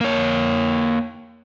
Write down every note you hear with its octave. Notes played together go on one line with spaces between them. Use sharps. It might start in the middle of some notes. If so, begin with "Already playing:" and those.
A#3 C#5